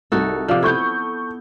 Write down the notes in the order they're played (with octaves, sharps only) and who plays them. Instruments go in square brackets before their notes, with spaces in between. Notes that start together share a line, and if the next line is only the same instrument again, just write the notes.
[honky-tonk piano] C2 [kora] D#4 F#4 A4
[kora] C3 F3 [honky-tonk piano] D5 F5 D6
[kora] B3 E4 [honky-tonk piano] A4 C#6 G6